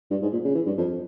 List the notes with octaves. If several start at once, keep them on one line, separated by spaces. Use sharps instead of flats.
G2
G#2
A#2
C#3
E3
G2
F2